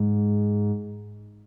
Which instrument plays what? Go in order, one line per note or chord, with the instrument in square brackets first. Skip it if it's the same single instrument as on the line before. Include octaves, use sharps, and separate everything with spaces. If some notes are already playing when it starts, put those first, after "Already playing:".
Already playing: [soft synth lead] G#2